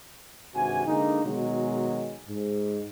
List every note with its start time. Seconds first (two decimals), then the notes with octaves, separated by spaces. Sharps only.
0.54 G#1 G2 C3 F#4 G#5
0.86 D3 G#3 A#3 D#4
1.24 B2 D#3 F#3 G#3
2.28 G#2